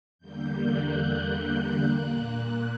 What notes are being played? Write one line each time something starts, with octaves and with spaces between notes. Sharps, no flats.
E2 D3 G3 A#3 G6
F#6
A#2 A#3